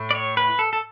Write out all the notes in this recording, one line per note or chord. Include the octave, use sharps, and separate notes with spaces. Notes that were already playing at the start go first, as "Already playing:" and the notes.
Already playing: A2
D5
C#5
B4
A4
A4